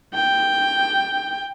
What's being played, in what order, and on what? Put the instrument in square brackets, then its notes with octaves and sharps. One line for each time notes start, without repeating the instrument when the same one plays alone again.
[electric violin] G5